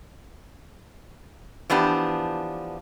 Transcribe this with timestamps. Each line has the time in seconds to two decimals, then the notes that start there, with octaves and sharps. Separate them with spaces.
1.70 E3 F3 B3 D4 G4